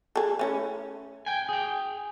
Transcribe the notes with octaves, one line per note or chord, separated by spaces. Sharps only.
G#4 A4
A3 C#4 E4
G5 G#5
G#4 G5